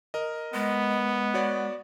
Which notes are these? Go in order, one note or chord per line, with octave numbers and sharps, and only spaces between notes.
A#4 D#5
G#3 B3
F#4 C#5 D5